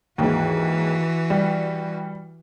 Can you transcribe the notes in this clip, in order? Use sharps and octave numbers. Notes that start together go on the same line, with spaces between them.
D#2 G#2 E3 F#4
G3